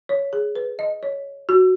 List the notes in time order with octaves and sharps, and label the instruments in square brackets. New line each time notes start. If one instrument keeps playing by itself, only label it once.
[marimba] C#5
G#4
B4
D#5
C#5
F#4